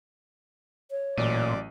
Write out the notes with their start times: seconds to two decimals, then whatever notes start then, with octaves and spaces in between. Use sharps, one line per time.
0.91 C#5
1.18 A1 A#2 F#3 D5 D#7